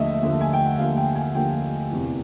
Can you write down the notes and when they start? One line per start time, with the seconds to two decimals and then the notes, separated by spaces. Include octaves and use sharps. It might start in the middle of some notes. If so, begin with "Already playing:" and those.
Already playing: D#2 D3 F3 A3 D#5 E5
0.22 D#2 D3 F3 A3
0.41 G#5
0.53 G5
0.65 F#5
0.78 D#2 D3 F3 A3 F5
0.97 G5
1.15 G#5
1.35 D#2 D3 F3 A3 G5
1.91 E2 C3 E3